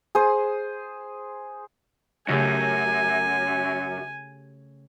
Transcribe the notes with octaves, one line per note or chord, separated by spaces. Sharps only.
G#4 C5 D#6
F#2 C#3 A3 G4 G#5